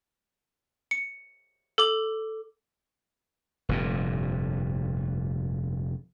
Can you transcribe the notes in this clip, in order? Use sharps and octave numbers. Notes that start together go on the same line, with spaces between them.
C#7
A4 D6 F#7
F1 G2 A#2